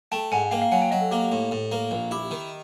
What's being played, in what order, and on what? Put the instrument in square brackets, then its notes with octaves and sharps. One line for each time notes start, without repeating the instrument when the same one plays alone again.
[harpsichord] A3 [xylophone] G5 A5
[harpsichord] G#2 [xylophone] F#5 G#5
[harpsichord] A#3 [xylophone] F5 G5
[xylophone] F5
[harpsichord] F#3 [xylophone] F#5 G#5
[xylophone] F5 G5
[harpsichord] F#3 [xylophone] D#5
[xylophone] A4
[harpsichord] A#3 [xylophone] G4
[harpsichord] A2
A2
A#3
A#1
[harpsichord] E4 [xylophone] G4
[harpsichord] D#3